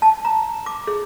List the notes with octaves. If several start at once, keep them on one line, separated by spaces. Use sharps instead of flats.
A5
A#5
D6
G#4